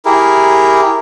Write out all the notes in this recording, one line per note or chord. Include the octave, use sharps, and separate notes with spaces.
E4 G4 G#4 A#4